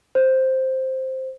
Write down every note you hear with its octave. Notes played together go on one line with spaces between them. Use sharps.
C5